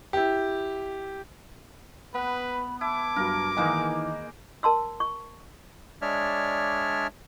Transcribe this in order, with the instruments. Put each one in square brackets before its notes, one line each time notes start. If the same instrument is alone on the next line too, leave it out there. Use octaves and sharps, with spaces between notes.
[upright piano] E4 G4
[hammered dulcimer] B3 [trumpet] B4 [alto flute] B5
[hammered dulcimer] E4 [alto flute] A5 [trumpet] D6
[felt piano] G2 F#3 [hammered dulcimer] A#4
[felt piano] D#3 E3 [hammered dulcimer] G#3 A#3 D#4 [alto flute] D#5
[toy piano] A#4 A5 C6 E6
C#6
[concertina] G#3 D4 C#5 D5 E5 F6